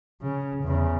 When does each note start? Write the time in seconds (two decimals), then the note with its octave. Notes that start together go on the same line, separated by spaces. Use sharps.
0.22 C#3
0.63 E2 C#3